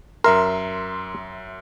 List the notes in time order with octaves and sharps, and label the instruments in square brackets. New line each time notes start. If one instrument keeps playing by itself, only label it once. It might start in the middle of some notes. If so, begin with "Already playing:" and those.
[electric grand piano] F#2 E5 C6 [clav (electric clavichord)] A#4